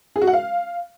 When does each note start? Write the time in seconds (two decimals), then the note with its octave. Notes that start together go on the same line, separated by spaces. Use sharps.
0.16 G#4
0.22 F#4
0.27 F#5
0.33 F5